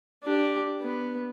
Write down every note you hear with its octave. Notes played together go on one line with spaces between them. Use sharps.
D4 G4
B3